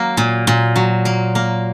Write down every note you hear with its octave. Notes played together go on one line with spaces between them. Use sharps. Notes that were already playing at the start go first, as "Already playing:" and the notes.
Already playing: F#3 A#3
A#2
A#2
F#3
A#3
A#3